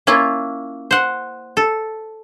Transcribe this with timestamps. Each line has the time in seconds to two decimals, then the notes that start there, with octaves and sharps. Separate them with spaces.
0.07 A#3 C#4 E4 F4
0.91 C5 F#5
1.57 A4